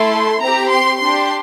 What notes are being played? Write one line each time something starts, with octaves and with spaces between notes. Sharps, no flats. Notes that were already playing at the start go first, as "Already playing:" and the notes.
Already playing: A3 E4 A4 C6
C4 G4 A#5
C6
D4 G4 C6